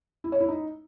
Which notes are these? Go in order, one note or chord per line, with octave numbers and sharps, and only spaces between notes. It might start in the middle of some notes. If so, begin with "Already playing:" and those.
E4
C#5
E4
D#4